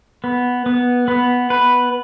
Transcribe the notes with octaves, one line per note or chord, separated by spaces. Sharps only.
B3
B3
B3
B4